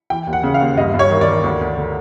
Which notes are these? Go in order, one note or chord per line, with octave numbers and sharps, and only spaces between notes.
E3 G5
D#2
F#5
C#3
F5
D#2
G2 D#5
G2
C#5
D#3
D5
D#3
D2
D2
D3